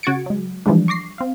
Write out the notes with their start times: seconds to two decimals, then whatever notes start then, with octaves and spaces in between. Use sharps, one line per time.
0.03 C#3 F#4 G#6 A6 C#7 D7
0.26 F#3 G#3
0.66 E3 F3 G3 G#3 D4
0.88 C#6 D6 A#6 C7
1.18 C4 F5